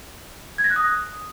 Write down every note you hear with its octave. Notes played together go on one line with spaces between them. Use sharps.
G#6
A#6
F#6
D#6